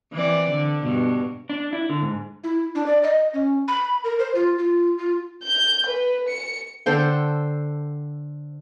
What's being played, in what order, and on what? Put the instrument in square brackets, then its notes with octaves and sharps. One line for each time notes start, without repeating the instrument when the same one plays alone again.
[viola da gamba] E3 C4 D5
D3
G2 B2
[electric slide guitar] D4
E4
D3
G#2
[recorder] E4
D4
D5
D#5
C#4
B5
A#4
C5
F4
F4
F4
[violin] G6
B4
C#7
[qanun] D3 A4 C5 G5